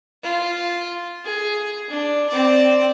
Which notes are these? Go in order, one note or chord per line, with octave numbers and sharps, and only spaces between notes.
F4
G#4
D4
C4 D5